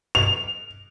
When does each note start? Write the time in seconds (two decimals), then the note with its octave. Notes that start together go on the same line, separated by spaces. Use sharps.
0.15 F7